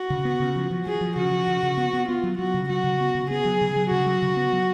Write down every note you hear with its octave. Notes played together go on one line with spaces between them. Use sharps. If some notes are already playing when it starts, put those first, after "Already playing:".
Already playing: F#4
C#3
B3
C#3
F3
F3
F3 G#4
F3
C#3 F#4
F3
C#3
C#3
B3
B3
B3 F4
F#3
F#3 F#4
C#3
F#3 F#4
C#3
B3
C#3
B3 G#4
F#3
C#3
F#3
C#3 F#4
F#3
C#3
B3
F#3